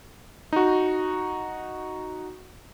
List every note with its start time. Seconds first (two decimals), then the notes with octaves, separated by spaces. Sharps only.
0.53 D#4 F#4